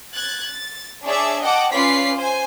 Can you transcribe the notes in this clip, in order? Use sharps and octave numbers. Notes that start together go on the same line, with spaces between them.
F#6 G#6 A6
A6
D4 G#4 C#5 D5 E5
D#5 F#5 G5 A5 D6
C#4 F4 B4 D5 B6 C7
C5 G#5